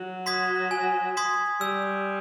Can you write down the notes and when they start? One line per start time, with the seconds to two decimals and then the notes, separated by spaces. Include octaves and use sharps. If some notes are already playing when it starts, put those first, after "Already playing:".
Already playing: F#3
0.26 C6 D#6 G#6 B6
0.71 G#5
1.17 C6 D#6 G#6 B6
1.61 G3 E6